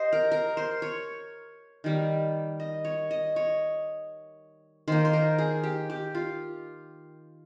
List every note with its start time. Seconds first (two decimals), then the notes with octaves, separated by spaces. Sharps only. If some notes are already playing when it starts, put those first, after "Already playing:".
Already playing: G4 C5 D#5
0.13 A#4
0.32 A#4
0.57 C5
0.82 C#5
1.84 D#3 G3 A#3
2.60 D#5
2.85 C#5
3.11 D#5
3.36 C#5
4.88 D#3 A#3 C5
5.05 C5
5.13 A#4
5.38 G#4
5.64 G4
5.90 G4
6.15 F4